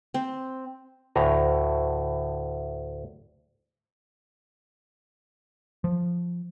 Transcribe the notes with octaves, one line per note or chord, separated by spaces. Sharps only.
C4
D2 A2 A#5
F3